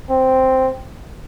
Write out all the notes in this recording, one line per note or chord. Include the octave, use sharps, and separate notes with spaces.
C4